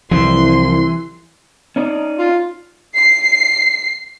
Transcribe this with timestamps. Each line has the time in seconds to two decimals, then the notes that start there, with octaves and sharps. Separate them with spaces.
0.11 C2 E3 F3 C4 C6
1.76 C#4 D#4 D5
2.19 F4
2.97 C7